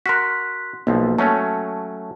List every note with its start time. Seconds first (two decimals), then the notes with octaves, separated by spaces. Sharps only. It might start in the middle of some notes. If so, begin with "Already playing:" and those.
0.06 F#4 A#4 C6 F#6 B6
0.87 B1 F3 A#3
1.19 F#3 A3 C#4 A5